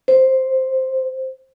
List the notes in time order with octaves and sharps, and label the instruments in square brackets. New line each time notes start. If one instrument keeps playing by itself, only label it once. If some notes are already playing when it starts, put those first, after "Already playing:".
[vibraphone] C5